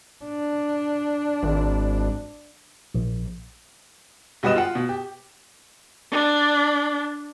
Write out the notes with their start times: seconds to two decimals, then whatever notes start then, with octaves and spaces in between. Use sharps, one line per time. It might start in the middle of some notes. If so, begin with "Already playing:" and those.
0.24 D4
1.43 G#1
2.95 A#1
4.43 B1 G3 F#4 B4 D#5 E7
4.56 F4 F#5
4.75 B2
4.89 G4
6.12 D4